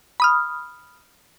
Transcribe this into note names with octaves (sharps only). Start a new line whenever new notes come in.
B5 D#6 F6